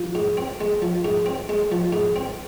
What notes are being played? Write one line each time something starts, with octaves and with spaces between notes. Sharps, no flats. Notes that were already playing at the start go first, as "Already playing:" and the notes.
Already playing: F3
G#2
C4
G#3
F3
G#2
C4
G#3
F3
G#2
C4